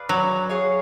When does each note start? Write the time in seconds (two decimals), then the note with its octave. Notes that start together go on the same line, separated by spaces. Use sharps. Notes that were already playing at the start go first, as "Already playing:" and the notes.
Already playing: G#4 B4 D5 F5
0.09 F#3
0.49 C#4 G#4 C#5 F5